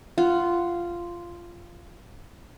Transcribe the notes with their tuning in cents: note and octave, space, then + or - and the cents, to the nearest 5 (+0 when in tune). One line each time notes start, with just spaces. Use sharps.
F4 -10 F#5 +5